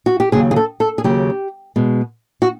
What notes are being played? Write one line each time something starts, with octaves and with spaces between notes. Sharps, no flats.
F#4
G4
D#2 C#3 F#3 G#4
G#4
A4
A4
G#4
D#2 C#3 F#3 G4
B2 G#3
F#4